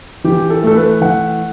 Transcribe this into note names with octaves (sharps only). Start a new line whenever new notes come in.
E3 G4
A4
A3 A4
B4
E3 F#5